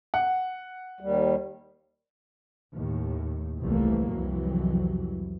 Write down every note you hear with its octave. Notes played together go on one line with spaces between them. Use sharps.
F#5
D#2 G3
D#2 A2
F1 C2 E3 A3 A#3
C2 F2 E3 F#3